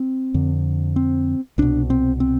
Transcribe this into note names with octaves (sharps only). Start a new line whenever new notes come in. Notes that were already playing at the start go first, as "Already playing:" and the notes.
Already playing: C4
F2 D3
C4
C2 B2 D4
C4
C4